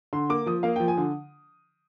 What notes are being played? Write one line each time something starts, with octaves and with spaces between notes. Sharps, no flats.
D3 C6
A#3 D6
F3 D#6
A#3 F5
F3 G5
G#5
D3